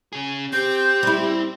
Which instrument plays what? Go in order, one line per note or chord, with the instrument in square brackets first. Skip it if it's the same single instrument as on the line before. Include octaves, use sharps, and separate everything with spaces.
[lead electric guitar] C#3 G#4
[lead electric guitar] C4 [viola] G4 [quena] G6
[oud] G3 E4